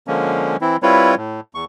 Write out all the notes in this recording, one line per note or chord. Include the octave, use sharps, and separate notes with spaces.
D3 F3 G#3 A#3 C#4
E3 C4 E4
G3 C4 E4 F4 B4 C#5
A2
E2 C#6